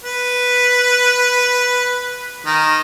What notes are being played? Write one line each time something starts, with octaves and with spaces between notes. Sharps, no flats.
B4
D#3